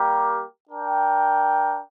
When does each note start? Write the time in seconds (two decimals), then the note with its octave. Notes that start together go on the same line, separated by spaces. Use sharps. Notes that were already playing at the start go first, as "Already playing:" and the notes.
Already playing: G3 A#3 G4 A#4
0.70 D4 A#4 G5